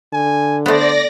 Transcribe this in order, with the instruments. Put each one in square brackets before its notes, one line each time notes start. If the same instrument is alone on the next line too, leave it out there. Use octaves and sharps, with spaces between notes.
[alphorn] D3 [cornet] G#5
[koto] A3 B3 [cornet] C5 [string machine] D5 A#6